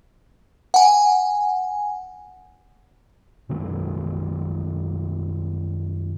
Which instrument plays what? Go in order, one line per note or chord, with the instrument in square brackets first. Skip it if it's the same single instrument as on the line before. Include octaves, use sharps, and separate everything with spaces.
[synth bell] F#5 G#5
[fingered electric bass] F#2 B2 D#3 G#3